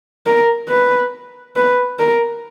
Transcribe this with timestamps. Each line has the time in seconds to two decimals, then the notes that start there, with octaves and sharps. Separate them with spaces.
0.26 A#4
0.69 B4
1.56 B4
1.99 A#4